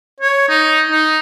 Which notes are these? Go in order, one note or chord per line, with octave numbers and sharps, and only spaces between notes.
C#5
D#4
D#4